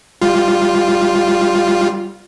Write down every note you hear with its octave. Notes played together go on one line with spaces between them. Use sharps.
G3 F4